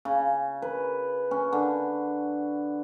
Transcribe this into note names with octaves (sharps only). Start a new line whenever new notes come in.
C#3
B4
C#4
D3